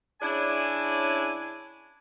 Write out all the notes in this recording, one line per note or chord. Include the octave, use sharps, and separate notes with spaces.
C#3 C#4 D4 E4 D5 G#5